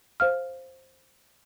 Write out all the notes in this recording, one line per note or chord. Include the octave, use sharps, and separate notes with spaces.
C5 F5 F6